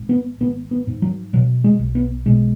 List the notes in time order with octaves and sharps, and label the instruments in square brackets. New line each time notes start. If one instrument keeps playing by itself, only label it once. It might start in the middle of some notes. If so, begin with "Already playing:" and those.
Already playing: [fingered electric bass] G#1
B3
G#1 B3
B3
G#2
F#3
B2 F#3
G#3
B1
B3
B2 G#3